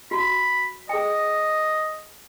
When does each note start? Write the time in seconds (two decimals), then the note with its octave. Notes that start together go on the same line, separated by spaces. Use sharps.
0.11 F#4 B5
0.89 G#4 D#5 G5